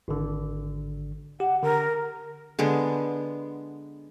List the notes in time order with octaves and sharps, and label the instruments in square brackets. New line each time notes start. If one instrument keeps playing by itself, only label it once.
[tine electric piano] G#1 D3
[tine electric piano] G4 [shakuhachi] F#5
[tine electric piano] D3 [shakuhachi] A#4
[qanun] D3 G#3 B3